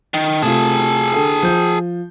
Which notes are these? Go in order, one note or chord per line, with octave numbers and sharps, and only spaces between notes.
D#3
C3 A3 F4 G#4 A5
D3 A4
F3 G6